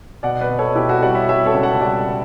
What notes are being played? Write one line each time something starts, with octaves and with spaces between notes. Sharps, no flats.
B2 D5 F#5
B4 D5
B2
A4 C#5
B2 E4 G4
F#4 A4
G3 D5 F#5
C#5 E5
G3 C#5 E5
A4 C#5
C#2
F#5 A5
G3 D5 F#5